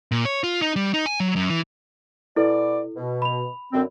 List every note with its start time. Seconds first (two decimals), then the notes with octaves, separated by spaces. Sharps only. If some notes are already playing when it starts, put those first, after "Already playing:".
0.12 A#2
0.25 C#5
0.43 F4
0.62 D#4
0.76 G3
0.94 D#4
1.06 G#5
1.20 F#3
1.36 F#2
1.50 E3
2.36 B2 E4 A4 D5
2.96 B2
3.22 B5 F7
3.73 F#2 D3 C4